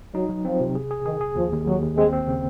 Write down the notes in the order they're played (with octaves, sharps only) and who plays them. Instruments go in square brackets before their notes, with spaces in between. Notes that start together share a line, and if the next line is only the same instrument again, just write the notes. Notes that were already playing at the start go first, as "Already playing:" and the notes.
[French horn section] F#3 [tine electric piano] D#4
[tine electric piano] F#3
[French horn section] F3 [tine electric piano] C4
[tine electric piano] C3
G#4
G#4
[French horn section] D#3 [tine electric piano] G#4
[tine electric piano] G#4
[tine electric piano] D#2 [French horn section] F3
[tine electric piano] D#2
[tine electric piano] D#2 [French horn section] F#3
[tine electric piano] D#2
[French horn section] G#3 [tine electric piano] C4
[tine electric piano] C4
C#3